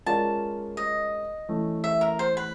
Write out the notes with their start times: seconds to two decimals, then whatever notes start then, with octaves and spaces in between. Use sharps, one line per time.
0.06 G#3 C#4 F4 A#4 D5 A5
0.77 D#5
1.49 E3 A3 C#4
1.84 E5
2.01 A#4
2.19 C5
2.37 B4